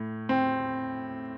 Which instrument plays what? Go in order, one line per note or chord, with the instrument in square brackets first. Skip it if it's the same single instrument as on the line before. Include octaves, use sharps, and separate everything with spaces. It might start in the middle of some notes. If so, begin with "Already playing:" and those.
Already playing: [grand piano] A2
C4